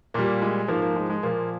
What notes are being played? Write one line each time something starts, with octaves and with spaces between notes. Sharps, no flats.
A#2 G3 A#3
G#3
G#2 F3 A#3
A#3
G#3
G#3
A#2 F3 A#3